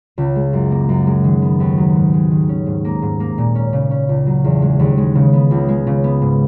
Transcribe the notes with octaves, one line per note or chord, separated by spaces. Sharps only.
C#2
G#3
F#2
A#3
F#2
G#3
D#3
B3
D#2
F#3
G#2
G#3
D#3
C#4
G#2
A#3
G#2
A#3
A#2
C#4
C#3
C#4
C#2
F#3
E2
G#3
D#2
G#3
C#3
B3
C#2
G#3
C#3
B3
G#2